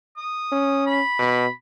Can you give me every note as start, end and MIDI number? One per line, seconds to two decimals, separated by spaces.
0.17 0.81 87
0.52 1.00 61
0.86 1.50 83
1.19 1.46 47